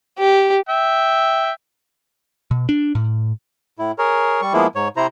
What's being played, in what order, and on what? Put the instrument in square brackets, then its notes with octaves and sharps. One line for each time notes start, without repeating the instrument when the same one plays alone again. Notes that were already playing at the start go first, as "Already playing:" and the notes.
[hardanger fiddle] G4
[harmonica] E5 G5
[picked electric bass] B2
D4
A2
[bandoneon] A2 E4
G#4 A#4 C#5
G3 C#6
F3 G#3 A#3 B3 E4
G#2 C#5
C3 E4 C5 A#5